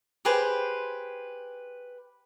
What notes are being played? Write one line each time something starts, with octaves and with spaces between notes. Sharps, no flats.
G4 G#4 B4 C5